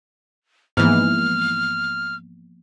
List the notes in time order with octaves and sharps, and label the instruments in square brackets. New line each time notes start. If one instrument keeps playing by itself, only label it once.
[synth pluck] G#2 E3 [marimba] F3 A#3 B3 [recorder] F6